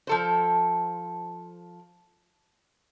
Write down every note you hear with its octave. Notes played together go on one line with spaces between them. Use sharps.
F3 A4 C5